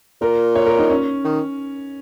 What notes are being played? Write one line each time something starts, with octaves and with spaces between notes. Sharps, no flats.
A#2 A#4
C#5
A#4
D#4
C#4
D#3